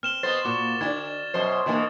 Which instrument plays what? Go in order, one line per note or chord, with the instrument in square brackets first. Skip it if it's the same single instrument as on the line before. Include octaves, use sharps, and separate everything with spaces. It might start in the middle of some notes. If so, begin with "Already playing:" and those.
[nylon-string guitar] C4 [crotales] F6 E7 G7
[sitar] B2 B3 C5 [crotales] A6
[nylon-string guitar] A#2 A#3 [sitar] F#4 [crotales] D6
[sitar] D3 [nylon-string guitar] E4 F#4 D5 [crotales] G#6
[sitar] F#2 B2 C5
[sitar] B2 D3 E3 [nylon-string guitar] A#3 G4 G#4